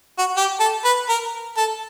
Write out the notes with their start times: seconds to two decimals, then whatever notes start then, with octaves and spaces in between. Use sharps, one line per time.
0.18 F#4
0.37 G4
0.60 A4
0.85 B4
1.09 A#4
1.57 A4